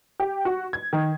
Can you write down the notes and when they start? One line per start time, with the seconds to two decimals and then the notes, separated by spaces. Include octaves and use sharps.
0.20 G4
0.45 F#4
0.73 G#6
0.93 D#3